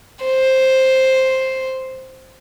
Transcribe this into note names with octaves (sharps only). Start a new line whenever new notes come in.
C5